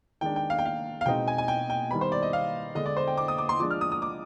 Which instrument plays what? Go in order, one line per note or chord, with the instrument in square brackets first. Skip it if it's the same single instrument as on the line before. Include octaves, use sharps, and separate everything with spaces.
[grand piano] D#3 G#3 D4 G5
G5
F5
G5
F5
F5
B2 G#3 C4 D#4 G5
G#5
G#5
G5
G5
D#3 G3 B3 B5
C5
D5
D#5
F5
D3 G#3 D4 D#5
D5
C5
G5
D6
D#6
D6
C6
F3 G#3 D4 D6
F6
D#6
D#6
D6